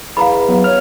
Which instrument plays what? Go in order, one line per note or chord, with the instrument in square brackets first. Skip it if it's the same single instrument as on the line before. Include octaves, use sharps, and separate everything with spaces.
[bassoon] E2 [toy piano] F5 A#5 B5
[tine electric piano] F#3 B3
[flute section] C#5 [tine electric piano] F6